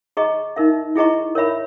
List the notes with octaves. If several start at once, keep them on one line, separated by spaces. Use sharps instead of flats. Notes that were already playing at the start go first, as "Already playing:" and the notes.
G#4 D#5 A#5 C#6
D#4 A#4 E5
E4 G#4 D#5 A#5 C#6
A#4 C#5 E5 B5